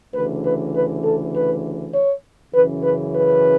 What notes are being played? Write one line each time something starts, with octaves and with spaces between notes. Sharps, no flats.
D2 C#3 E3 B4
B4
B4
A4
B4
C#5
F#2 C#3 E3 B4
B4
B4